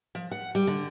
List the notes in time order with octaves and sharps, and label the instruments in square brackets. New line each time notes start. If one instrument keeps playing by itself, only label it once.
[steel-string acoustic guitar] F3
F#5
G3
D3